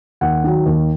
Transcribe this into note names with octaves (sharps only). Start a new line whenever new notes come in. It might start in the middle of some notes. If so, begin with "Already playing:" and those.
D#2 F#5
D#3 F#3
D#2